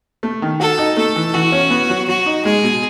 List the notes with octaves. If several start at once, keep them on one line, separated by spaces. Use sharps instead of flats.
A3
D#3
F#4 A4
D#4
A3 A4
E3
E3 F#4
C#4
B3
F#3
F#3 F#4
D#4
G#3 G#4
B2